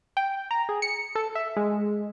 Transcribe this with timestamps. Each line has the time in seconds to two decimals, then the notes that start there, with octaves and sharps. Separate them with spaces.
0.17 G5
0.51 A#5
0.69 G#4
0.82 C#7
1.15 A4
1.35 E5
1.56 G#3